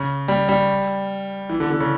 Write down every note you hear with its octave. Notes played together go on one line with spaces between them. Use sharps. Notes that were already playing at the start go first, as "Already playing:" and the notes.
Already playing: C#3
G3
G3
E3
D3
D3
C#3